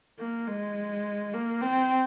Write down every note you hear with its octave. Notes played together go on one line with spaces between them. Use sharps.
A#3
G#3
A#3
C4